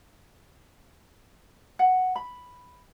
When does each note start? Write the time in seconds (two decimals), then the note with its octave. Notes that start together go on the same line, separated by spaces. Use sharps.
1.79 F#5
2.16 B5